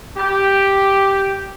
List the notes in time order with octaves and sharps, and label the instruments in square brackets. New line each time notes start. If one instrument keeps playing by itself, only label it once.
[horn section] G4